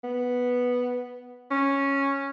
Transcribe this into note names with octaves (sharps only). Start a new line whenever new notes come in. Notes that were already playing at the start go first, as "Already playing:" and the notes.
B3
C#4